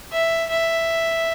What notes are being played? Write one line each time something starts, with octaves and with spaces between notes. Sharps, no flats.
E5
E5